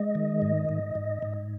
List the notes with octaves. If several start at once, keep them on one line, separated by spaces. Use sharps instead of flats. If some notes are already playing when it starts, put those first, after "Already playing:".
Already playing: G#3 D#5
D#3
G#2
G#2
G#2
G#2